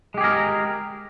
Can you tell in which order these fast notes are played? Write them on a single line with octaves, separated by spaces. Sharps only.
G#3 G4 G#4 A#4